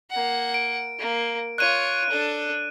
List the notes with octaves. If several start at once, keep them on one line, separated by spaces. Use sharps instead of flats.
A#3 F#5
D7
A#3
F4 C#5 F#6 D#7
D4 A4